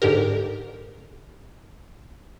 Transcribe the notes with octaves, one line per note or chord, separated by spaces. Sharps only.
G#2 D3 G4 A#4